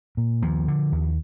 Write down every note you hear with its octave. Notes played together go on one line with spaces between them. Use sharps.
A#2
D#2 F3
D3
D#2